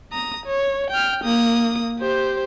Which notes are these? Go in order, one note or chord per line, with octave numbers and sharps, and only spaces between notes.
A#5 D#6
C#5
G5 F6
A#3 D#6
G4 C5